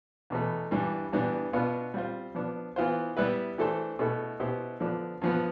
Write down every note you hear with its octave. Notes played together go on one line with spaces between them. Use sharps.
E2 B2 A3
G2 E3 G3 D4
G2 E3 G3 B3 D4
B2 B3 D4 F4
G3 C4 F4 C5
F3 B3 D4
E3 B3 F4 C5
G3 B3 E4 B4
E3 A3 D4 A4 C5
B2 A3 E4 A4
B2 B3 E4 G4 C5
D3 F3 B3 D4
G2 F3 B3